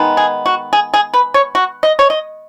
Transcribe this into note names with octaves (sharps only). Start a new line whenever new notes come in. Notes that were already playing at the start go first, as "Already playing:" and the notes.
Already playing: D#3 G#3 B3 D#4
G#4
F#4
G#4
G#4
B4
C#5
F#4
D#5
C#5
D#5